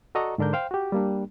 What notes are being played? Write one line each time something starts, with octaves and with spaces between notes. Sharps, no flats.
F#4 A4 D5 D#5 A#5 C#6
G#2 D3 D4 A#4 G6
C5 F5 G5
F#4 G4
G3 A#3 D4